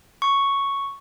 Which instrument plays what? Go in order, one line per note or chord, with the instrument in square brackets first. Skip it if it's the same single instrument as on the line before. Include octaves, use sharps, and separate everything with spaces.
[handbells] C#6